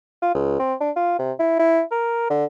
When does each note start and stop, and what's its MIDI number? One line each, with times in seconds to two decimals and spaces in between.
0.22 0.34 65
0.35 0.57 37
0.60 0.74 60
0.81 0.91 62
0.96 1.16 65
1.19 1.32 48
1.39 1.55 64
1.59 1.82 64
1.92 2.27 70
2.30 2.45 50